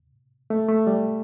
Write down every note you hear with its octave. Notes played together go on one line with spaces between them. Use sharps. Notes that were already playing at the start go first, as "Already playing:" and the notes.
A3
A3
G3